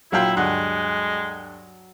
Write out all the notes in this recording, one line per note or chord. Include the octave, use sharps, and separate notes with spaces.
A#1 F#3 E4 F4 G5
D2 G2 G#3 F#5